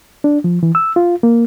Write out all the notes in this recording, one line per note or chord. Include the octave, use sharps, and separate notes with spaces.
D4
F3
E3
E6
F4
A#3